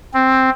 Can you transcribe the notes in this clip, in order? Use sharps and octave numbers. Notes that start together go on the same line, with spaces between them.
C4